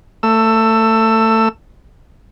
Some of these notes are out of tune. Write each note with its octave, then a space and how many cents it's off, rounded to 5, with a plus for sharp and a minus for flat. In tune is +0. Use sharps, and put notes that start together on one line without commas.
A3 +25 E6 +10